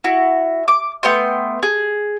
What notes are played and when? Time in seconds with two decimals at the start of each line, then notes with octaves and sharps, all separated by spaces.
0.04 E4 F#4
0.68 D6
1.03 A3 B3 G5 C6
1.63 G#4